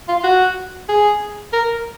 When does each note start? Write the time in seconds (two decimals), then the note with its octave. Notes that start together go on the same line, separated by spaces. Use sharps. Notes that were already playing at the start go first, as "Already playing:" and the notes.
0.08 F4
0.24 F#4
0.89 G#4
1.53 A#4